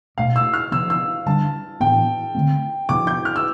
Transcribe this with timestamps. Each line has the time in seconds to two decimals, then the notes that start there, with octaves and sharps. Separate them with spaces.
0.18 B2 A3 D4 F5
0.36 E6
0.53 F6
0.72 C3 F3 B3 D4 E6
0.90 E6
1.26 D3 G3 D4 A5
1.80 A2 E3 B3 D4 G5
2.35 D3 A3 C4
2.89 C3 F3 B3 D4 D6
3.07 G6
3.25 F6
3.36 E6